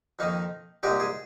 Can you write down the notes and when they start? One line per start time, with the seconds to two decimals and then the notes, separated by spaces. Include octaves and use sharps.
0.19 F2 D#3 A#3 D#4
0.83 C2 A#2 G#3 D#4 G4
1.00 G#4